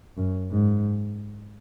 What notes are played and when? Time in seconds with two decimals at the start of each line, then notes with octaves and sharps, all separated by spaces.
0.17 F#2
0.51 G#2